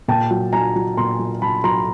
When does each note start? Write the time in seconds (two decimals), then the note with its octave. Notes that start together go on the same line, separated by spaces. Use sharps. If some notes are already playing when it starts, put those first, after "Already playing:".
0.08 A#2 G5 A5
0.31 F#3
0.53 F#3 G#5 A#5
0.76 F#3
0.97 A#2 A#5 C6
1.19 F#3
1.42 F#3 A5 B5
1.64 F#3 A#5 C6